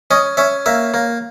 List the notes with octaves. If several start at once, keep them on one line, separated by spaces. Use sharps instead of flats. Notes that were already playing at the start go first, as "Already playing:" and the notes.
C#4 D#5
C#4 E5
A#3 E5
A#3